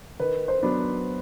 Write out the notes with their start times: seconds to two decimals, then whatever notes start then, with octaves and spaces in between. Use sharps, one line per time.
0.20 D#3 B4
0.48 C5
0.63 F#3 B3 D4